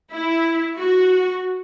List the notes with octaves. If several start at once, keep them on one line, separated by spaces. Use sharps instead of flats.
E4
F#4